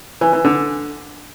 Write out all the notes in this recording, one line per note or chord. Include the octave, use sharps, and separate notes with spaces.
E3
E3
D3